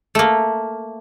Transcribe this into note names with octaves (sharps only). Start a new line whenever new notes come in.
A3 A#3